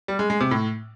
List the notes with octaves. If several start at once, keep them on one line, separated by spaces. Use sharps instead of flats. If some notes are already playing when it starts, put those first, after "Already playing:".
G3
G#3
G#3
C3
A2